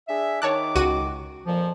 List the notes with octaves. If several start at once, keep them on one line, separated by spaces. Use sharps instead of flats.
D4 G#4 E5
D#3 C#5 A5 D6 F#6
C#2 F#4 D#7
F2 A#2 F3